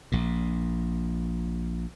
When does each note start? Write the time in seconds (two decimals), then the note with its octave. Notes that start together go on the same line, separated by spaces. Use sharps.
0.12 A#1 A#2